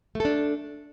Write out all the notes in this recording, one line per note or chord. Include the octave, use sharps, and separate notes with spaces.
A3 D4 A4